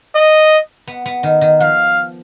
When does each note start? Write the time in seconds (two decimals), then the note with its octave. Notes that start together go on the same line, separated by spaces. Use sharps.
0.15 D#5
0.87 B3
1.06 B3
1.23 D#3
1.41 D#3
1.60 F3 F5